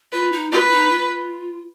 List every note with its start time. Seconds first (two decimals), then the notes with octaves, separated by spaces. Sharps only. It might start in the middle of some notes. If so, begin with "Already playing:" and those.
0.12 F4 B4
0.32 D#4
0.51 F4 B4
0.71 D#4
0.90 F4